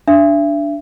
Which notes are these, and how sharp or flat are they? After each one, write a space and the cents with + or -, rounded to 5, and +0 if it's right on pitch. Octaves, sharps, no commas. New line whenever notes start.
D4 +0 E5 +35